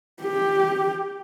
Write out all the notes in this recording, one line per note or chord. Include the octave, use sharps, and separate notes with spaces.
G4